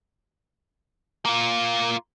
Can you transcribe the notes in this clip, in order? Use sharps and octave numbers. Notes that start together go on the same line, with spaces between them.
A#3 F4